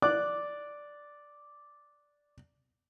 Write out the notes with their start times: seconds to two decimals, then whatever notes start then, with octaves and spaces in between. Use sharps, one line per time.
0.02 D5 D6 F#6